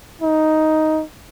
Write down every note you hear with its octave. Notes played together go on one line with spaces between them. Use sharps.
D#4